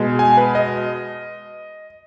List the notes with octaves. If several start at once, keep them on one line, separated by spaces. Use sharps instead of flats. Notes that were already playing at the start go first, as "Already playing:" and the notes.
Already playing: B2 G#3
G#5
B4
D#5